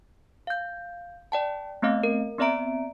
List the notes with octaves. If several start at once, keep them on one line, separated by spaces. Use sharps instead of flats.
F5 G6
D5 G5 A5
A3 B3 C4 D#5 F5
A#4
B3 C4 D5 E5 A#5 D7